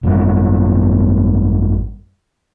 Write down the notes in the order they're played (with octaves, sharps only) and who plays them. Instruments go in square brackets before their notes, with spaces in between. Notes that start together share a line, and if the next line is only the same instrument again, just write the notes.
[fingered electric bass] G#1 F#2 D#3 G3